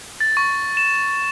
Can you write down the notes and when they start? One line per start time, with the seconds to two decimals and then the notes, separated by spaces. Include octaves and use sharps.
0.20 A6
0.37 C#6
0.77 E7